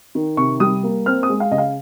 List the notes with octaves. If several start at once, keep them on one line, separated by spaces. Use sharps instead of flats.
D#3
C3 C#6
G3 D#6
A#3
C4 F6
D#6
G#3
F5
C#3 D#5
F5